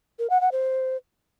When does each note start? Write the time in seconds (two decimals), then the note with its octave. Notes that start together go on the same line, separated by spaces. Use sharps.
0.19 A#4
0.30 F#5
0.41 F#5
0.52 C5